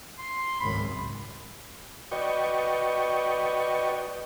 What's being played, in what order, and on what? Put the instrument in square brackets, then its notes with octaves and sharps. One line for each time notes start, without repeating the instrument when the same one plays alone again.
[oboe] C6
[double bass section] G#1 C#2 F#2 [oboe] B5
[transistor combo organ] F#4 B4 D5 D#5 G5 C#6